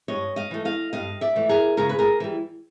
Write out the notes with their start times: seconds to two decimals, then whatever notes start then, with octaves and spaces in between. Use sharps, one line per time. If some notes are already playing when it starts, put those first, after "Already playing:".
0.08 G2 C#5 D#5
0.36 D#5 F5
0.51 E3 A3
0.65 D#5 F5
0.93 G2 D#5 F5
1.21 D5 E5
1.35 E3 A3
1.49 G#4 A#4
1.77 C#3 G#4 A#4
1.89 B4
1.99 G#4 A#4
2.20 E3 G3